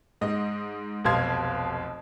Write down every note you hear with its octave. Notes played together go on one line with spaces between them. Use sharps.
G#2 D#5
F1 B1 B2 F5 C6 G#6